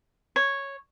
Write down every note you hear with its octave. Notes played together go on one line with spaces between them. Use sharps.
C#5